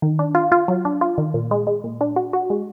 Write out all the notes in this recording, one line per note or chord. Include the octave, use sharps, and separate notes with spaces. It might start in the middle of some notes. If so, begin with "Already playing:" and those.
D#3
D4
F4
F4
F#3
D4
F4
D#3
A#2
G#3
G#3
A#2
D4
F#4
F#4
G#3